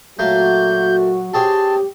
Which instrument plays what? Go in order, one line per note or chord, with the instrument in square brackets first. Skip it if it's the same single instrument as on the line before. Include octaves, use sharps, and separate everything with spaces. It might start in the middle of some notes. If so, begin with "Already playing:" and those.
[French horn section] A#2 F#3 [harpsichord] A3 A#3 [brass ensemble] F#4 [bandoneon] G6
[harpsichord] C4 G#4 C#5 [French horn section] G4 [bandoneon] A5